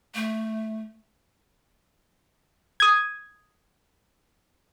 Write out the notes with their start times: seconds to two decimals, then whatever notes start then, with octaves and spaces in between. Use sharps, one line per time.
0.15 A3
2.80 D#6 G#6